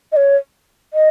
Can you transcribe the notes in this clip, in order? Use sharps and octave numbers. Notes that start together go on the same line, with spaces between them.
D#5
C#5
D#5